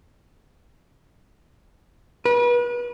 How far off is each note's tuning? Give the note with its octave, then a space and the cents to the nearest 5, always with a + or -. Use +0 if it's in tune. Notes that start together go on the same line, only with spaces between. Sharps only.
B4 -35